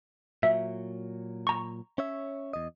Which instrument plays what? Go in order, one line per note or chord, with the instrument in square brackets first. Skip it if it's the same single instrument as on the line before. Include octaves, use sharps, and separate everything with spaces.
[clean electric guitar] A#2 F#3 [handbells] E5
[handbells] A#5 C#6
[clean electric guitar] C#4 C#5 E5
E2 D#5